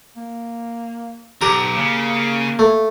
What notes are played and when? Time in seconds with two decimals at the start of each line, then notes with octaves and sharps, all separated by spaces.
0.17 A#3
1.41 B1 G4 A#5
1.76 C#3 A#3
2.59 A3